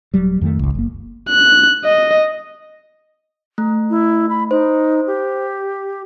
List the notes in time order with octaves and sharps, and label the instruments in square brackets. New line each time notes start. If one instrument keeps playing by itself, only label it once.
[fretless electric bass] D#1 F#3 G3
F2 D#3 G#3 A3
G1 C#2
F#1 A#3
[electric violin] F#6
D#5
[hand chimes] A3
[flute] E4
B5
[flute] D#4 [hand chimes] C5
[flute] G4